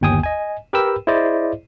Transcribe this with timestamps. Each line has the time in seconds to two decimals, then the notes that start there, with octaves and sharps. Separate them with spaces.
0.01 G1 D#2 G5 G#5 D#6
0.23 D#5 G#5
0.73 G4 A#4 B4 G5 B5 E6
1.07 E4 G#4 C5 D5 D#5